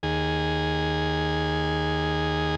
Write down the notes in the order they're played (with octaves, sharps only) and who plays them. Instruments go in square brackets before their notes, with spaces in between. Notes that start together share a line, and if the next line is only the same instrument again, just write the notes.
[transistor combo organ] D#2 G#4